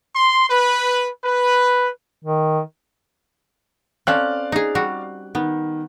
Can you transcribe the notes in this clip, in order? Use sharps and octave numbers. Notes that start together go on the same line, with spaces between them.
C6
B4
B4
D#3
C4 C#4 A4 D5 F5 F#6
D#4 G#4
G3 F#4
D#3 B3